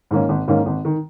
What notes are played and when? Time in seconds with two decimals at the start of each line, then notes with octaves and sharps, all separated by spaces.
0.11 G#2 D#3 A#3 C#4
0.29 G#1
0.48 G#2 D#3 A#3 C#4
0.66 G#1
0.85 D#3